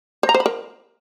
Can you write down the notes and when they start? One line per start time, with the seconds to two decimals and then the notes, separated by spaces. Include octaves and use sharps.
0.23 C5
0.29 A#5
0.34 C5
0.40 B5
0.46 A#4